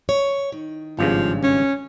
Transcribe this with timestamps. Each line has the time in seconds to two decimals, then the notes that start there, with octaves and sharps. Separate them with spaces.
0.09 C#5
0.52 D#3
0.99 G#1 G2 C#3 F3
1.43 C#4